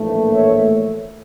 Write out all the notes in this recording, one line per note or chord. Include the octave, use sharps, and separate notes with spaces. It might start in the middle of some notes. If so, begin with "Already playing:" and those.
Already playing: A#1 A2 E3 A3
C#5 E5